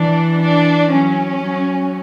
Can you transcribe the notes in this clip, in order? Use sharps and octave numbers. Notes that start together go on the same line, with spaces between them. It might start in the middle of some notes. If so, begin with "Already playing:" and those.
Already playing: E3 D4
D4
F#3 C#4
F#3